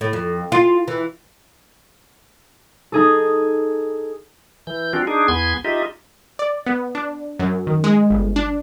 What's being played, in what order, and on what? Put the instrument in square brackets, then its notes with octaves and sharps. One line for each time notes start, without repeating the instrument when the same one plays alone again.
[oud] A2
F2
F4
E3
[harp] D#4 G#4 A4
[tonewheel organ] E3 G6
C4 D4 F4 F#4
D4 D#4 G#4
E2 B3 G#5 C6 G#6
D#4 F4 G4 D#5 E5
[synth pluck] D5
B3
D4
F#2
D#3
G#3
G1
D4